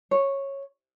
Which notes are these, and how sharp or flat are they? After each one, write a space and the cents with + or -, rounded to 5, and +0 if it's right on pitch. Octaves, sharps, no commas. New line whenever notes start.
C#5 -10